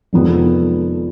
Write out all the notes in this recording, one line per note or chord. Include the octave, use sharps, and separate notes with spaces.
F1 F2 D#3 G#3 B3